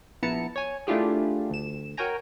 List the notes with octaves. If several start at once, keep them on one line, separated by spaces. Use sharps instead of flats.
A#1 B3 E4 A5 A#5 C#7
C#5 G#5
A3 D4 E4 F4 G4 G#4
D2 E7
F#4 A#4 C#5 G5 G#5 A#5